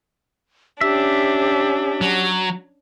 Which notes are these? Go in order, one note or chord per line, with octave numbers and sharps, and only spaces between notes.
C#4 D4 G4 E5
F#3